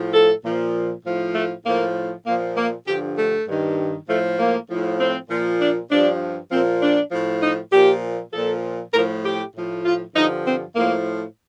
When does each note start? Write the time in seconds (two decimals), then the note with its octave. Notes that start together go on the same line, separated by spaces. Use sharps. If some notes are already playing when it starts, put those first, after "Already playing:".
Already playing: A2 F3
0.14 A4
0.45 A#2 F3
1.05 A2 F3
1.35 A3
1.65 A2 F3 A#3
2.26 A#2 F3 A#3
2.57 A#3
2.87 G2 D3 F3 G4
3.17 A3
3.48 G2 D#3
4.09 A2 F3 A3
4.39 A#3
4.70 A2 F3
5.00 C4
5.30 A#2 F3
5.61 D4
5.91 G2 F3 D4
6.52 A#2 F3 C4
6.82 D4
7.12 A2 F3
7.43 D#4
7.73 A#2 F3 G4
8.33 A#2 F3 A4
8.94 A2 F3 A#4
9.25 G4
9.55 A2 F3
9.85 F4
10.15 G2 D3 F3 D#4
10.46 C4
10.76 A2 F3 A#3